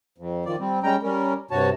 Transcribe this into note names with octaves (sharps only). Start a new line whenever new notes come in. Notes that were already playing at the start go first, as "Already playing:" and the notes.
F2
D#3 F3 D5
G3 C4
G3 G#3 C#4 G5 A#5
G3 C#4 A#4
G2 C3 F#4 C#5 A5